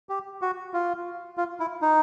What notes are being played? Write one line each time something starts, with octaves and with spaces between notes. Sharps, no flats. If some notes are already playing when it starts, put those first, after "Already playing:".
G4
F#4
F4
F4
E4
D#4